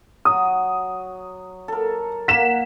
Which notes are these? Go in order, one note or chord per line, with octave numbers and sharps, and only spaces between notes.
F#3 D#6
A4 A#4
A#3 F#5 B6 E7